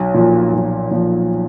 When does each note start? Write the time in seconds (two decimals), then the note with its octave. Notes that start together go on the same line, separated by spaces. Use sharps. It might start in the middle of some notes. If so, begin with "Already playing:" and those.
Already playing: B1
0.14 A#2 F3
0.53 B1
0.91 A#2 F3